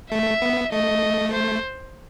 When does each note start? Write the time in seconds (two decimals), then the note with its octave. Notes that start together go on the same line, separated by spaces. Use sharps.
0.11 A3 E5
0.42 B3
0.72 A3 D#5
1.33 C5